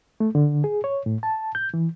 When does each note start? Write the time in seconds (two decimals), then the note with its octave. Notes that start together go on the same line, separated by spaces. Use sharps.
0.20 A3
0.35 D3
0.64 G#4
0.84 C#5
1.06 A2
1.23 A5
1.55 G6
1.74 E3